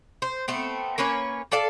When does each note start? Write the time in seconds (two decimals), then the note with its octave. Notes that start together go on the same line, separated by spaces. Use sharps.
0.22 C5
0.48 A3 B3 C4
0.98 A#3 C#4 B4 C#5
1.52 A4 D5 F5 A5